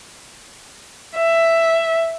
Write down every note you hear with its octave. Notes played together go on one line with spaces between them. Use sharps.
E5